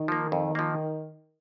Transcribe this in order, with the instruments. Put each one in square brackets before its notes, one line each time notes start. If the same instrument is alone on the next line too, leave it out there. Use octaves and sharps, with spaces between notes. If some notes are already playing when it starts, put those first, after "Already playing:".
Already playing: [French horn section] D#3
[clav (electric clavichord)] F3 A#3
F2
F3 A#3